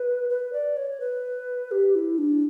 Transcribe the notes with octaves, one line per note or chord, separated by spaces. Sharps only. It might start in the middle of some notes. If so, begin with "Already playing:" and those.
Already playing: B4
B4
D5
C#5
B4
G4
E4
D4